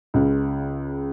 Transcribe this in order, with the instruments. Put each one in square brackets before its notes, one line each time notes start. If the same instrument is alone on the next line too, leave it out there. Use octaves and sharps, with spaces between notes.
[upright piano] C#2 C#3